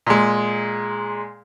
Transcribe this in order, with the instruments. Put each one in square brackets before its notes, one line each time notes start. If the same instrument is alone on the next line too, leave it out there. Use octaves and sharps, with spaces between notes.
[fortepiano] A#2 G#3